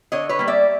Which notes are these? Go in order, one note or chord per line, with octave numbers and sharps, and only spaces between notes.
D3 C#5 D#5
B4 C#5
G3 A#3
D5 E5